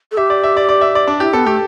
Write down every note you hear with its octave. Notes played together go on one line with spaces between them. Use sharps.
A4
G4 E5
D5
E5
D5
D5
E5
D5
D4
E4 G4
B3 A4
A3 G4